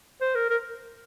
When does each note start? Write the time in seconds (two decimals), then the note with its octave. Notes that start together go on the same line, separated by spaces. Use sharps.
0.21 C5
0.35 A#4
0.50 A#4